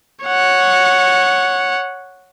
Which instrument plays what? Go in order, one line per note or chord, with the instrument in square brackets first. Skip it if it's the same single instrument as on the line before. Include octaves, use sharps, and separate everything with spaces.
[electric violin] C#5 F#5